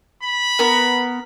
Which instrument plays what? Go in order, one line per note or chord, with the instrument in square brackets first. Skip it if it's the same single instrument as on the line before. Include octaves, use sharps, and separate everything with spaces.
[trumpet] B5
[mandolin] B3 A#4